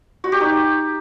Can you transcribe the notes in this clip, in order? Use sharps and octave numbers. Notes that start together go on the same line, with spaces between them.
F#4
G4
D#4